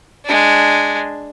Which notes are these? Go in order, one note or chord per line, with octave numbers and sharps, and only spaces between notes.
G#3 D4